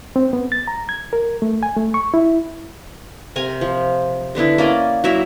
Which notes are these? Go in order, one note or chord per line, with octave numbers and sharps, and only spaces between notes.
C4
B3
A6
A#5
G#6
A#4
A3
G#5
A3
C#6
E4
C3 A#4 G#5
F3
D3 B3 D4 E4
A#3 C#4 D5 D#5
F#3 E4 A#4 E5